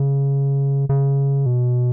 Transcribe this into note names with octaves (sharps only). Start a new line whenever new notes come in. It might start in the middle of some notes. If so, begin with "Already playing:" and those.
Already playing: C#3
C#3
B2